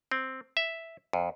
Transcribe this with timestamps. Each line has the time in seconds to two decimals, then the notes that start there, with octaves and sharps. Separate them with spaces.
0.12 C4
0.57 E5
1.13 F2